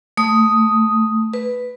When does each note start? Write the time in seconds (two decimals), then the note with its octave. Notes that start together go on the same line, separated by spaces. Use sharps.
0.17 A3 D#6
1.34 B4